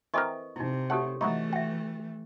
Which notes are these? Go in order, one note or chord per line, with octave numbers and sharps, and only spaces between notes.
E3 C4 A4 A#4 D#5 C#6
C3 D#4 E4
A3 G4 A4 C#5 F#5
E3 A3 D#4 E4 F#4 C#6
F#4 E5 G5